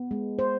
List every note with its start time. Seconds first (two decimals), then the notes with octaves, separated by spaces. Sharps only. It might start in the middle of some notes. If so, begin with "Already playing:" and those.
Already playing: B3
0.11 G#3
0.39 C5